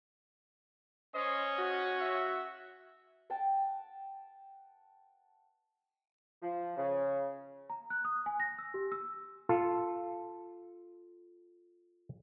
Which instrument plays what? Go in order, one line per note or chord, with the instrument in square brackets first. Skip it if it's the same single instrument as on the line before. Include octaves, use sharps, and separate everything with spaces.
[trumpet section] C#4 [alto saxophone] C5 [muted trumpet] D#5
[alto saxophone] F#4
[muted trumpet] E5
[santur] F#5 G5 A5
[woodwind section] F3
C#3
[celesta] A#5
F#6
D#6
G#5
A#6
E6
G4
E6
[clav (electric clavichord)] F4 A4